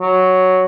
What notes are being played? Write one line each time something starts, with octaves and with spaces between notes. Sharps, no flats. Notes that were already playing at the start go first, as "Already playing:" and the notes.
F#3